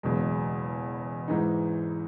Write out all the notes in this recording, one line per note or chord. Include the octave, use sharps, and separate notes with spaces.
F#1 E2 B2 G#3
G#2 E3 G#3 D#4